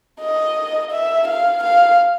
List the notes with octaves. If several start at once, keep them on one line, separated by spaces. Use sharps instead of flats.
D#5
E5
F5
F5